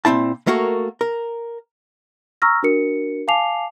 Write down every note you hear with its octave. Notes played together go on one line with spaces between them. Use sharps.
A#2 A3 C4 E4 A5
A3 A#3 F#4 A#4
A#4
A#5 C#6 E6 F6 A#6
D4 F#4 A#4 C#7
F5 G#5 A5 D6 C7 F7